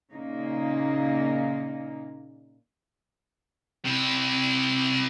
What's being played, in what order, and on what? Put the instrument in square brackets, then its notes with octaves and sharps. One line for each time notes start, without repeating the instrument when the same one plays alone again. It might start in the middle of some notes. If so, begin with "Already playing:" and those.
[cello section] A#2 C#3 A#3 D#4
[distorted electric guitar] C3 E4